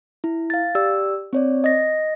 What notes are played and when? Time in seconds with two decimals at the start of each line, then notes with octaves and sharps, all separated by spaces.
0.24 E4
0.50 F5 A6
0.75 G4 D5 E6
1.33 C4 C#5 D5
1.64 D#5 A#6